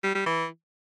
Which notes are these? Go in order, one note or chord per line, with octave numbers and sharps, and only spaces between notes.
G3
G3
E3